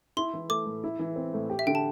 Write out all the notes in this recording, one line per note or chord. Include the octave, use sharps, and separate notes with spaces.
E4 C6
E3
A3 D6
A2
E4
E3
C4
A2
G4
E5
D3 G5
A5